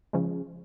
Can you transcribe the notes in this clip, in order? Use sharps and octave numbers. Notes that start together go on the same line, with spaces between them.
C#3 F3 G#3